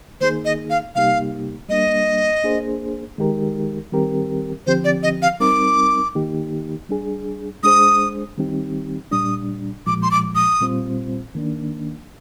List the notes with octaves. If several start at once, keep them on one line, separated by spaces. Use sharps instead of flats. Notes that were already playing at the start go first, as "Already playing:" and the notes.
D#3 A#3 D#4 G#4 C5
D#5
F5
C3 G3 A#3 D#4 G4 F5
G3 A#3 D4 D#5
A#3 D4 G#4 C5
D#3 G#3 D#4 G4 A#4
D#3 G3 C4 G4 A#4
D3 F3 C4 G4 C5
D5
D#5
F5
G3 C4 D#4 A#4 D6
D#3 A#3 D#4 G4
G3 D4 G#4
G#3 D4 G#4 C5 D#6
D#3 G3 C4 D#4 G4
A#2 G3 D4 D#6
A#2 F3 G#3 D6
C6
D6
D#6
A#2 G3 C4 F4 C5
D#3 A#3 D4